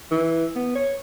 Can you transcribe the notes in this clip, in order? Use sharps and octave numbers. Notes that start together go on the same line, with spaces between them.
E3
B3
C#5